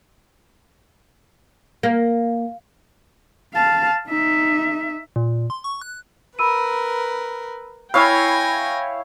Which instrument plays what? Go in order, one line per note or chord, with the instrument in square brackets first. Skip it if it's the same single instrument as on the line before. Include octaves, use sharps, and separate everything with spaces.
[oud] A#3
[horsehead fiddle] F5 A5
D#4 E5
[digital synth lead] A#2
C6
C#6
F#6
[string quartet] A#4 B4 [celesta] B5 E6 D#7
[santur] E4 C#5 F5 [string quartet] G5 G#5 A#6 [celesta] B5